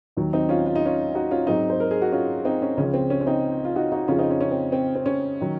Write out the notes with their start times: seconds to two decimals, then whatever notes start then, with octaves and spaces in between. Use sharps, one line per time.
0.17 D#2 D#3 F#3
0.33 C4 D#4
0.49 C#4 F4
0.66 F4
0.76 D#4
0.85 C#4 F4
1.15 D#4 F#4
1.31 C#4 F4
1.47 G#2 F#3 C4 D#4
1.70 C5
1.80 A#4
1.91 G#4
2.02 F#4
2.12 C#4 F4
2.45 C4 D#4
2.62 C#4
2.77 C#2 C#3 F3 C#4
2.94 C4
3.10 C#4
3.21 C#4
3.26 C4 D#4
3.64 F4
3.76 D#4 F#4
3.92 D#4 F#4
4.08 F2 C#3 F3 C#4 F4
4.19 C4 D#4
4.30 C#4
4.41 C#4
4.51 C4
4.72 C4
4.95 C4
5.06 C#4
5.41 D#3 F#3